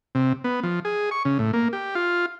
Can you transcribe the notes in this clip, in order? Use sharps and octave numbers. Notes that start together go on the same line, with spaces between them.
C3
B3
F3
G#4
C#6
C#3
A2
A#3
G4
F4